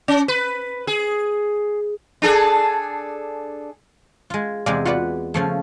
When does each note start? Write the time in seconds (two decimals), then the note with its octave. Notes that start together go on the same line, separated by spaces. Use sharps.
0.08 C#4
0.28 B4
0.87 G#4
2.22 D4 G#4 A4
4.30 G#3 F4
4.66 E2 C3 G#3 D5 F5
4.85 F4 F#4 B4 D5 F#5
5.34 C#3 F3 A3